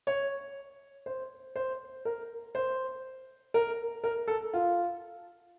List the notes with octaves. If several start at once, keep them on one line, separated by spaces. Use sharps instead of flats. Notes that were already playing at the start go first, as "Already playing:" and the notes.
C#5
C5
C5
A#4
C5
A#4
A#4
A4
F4